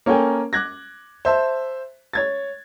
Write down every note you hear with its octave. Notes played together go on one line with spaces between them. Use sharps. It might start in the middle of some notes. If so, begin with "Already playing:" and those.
A#3 C#4 A4 A#4 G5 G#5
D6 F#6 G#6 A#6
C5 E5 A5
C#5 G#6 A6